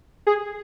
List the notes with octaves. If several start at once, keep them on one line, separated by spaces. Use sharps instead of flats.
G#4